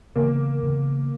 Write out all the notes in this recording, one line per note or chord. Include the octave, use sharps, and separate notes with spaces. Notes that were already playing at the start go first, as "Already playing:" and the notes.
C#3 E3 A#3 B3
C#3 E3 B3